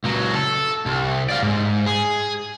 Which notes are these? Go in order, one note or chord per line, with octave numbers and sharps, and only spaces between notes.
C#2 F#3
A4
C2
D5 F5
G#2
G#4